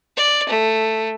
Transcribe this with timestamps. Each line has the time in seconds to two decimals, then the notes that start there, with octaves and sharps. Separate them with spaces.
0.17 D5
0.48 A3